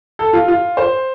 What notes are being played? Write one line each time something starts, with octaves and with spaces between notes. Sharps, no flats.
A4
F4
F4
C5